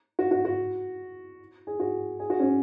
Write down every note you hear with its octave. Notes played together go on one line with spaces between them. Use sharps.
F#4
F#4
F#4
G#4
F#4
G#4
F#4
C#4